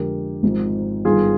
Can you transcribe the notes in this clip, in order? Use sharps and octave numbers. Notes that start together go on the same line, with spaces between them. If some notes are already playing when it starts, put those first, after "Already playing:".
Already playing: F2 D3 G#3 G4 A#4
G#1 G#2 F3
G1 G2 D#3 F4 G#4